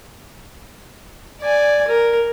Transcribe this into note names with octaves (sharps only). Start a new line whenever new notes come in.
D5 G#5
A#4